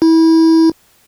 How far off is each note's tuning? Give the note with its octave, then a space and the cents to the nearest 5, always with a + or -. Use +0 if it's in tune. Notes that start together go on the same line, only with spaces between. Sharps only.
E4 -25